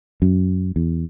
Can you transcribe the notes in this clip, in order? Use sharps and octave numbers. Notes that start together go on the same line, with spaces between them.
F#2
E2